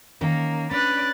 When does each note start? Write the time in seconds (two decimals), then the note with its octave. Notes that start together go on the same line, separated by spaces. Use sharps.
0.21 D#3 A#3 C#4 A#4
0.71 C#4 D4 B4 D5 F#6 A6